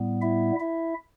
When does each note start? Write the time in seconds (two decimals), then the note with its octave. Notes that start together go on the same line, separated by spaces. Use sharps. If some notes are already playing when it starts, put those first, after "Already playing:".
Already playing: A2 G3 B3
0.22 E4 E5
0.60 E4 E5